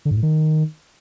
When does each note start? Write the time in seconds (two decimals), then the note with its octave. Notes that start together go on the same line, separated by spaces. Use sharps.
0.05 D3
0.11 G#2
0.17 A2
0.23 D#3